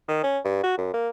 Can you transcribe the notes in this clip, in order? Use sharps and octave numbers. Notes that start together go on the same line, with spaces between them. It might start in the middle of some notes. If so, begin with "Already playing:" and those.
D#3
C#4
G2
F#4
F#2
A#3